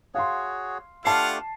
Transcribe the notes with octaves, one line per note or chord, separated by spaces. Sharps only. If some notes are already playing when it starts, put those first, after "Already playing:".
F#4 G#4 C#5 F5 C6
A3 D4 F4 G4 F5 F#5 A5 C7